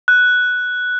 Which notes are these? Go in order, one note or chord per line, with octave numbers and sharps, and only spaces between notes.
F#6